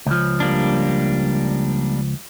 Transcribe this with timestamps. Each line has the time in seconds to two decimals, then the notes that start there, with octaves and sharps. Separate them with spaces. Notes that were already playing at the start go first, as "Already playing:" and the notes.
0.06 C#2 F3
0.40 G3 A#3 D4